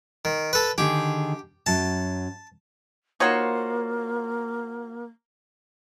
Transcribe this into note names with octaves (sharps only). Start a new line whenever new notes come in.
D#3
A4 B4
D3 D#3 G4 G#4
F#2 F#3 A5
A#3 D#4 F4 F#4 C5 C#5